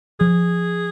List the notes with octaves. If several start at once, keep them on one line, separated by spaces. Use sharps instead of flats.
F3 G#4